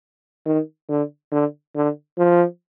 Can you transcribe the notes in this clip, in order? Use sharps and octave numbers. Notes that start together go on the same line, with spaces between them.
D#3
D3
D3
D3
F3